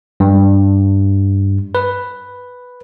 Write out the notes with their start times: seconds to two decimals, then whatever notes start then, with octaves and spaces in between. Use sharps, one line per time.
0.20 G2
1.75 B4